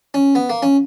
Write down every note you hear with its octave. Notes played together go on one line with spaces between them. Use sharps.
C#4
B3
A#3
C#4